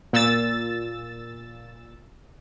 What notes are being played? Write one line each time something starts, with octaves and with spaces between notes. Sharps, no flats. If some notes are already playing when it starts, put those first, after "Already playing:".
A#2 E6 A6